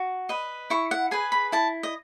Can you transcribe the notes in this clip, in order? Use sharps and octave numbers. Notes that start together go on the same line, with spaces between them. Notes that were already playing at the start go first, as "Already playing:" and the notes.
Already playing: F#4
B4 D#5
E4 C#6
F#5
G#4 B4 G#5
B5
E4 A5
D#5